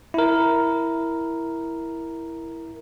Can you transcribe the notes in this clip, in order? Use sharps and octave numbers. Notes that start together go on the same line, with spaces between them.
E4 A#4